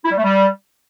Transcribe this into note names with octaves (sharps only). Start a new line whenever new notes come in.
E4
G3
A3
G3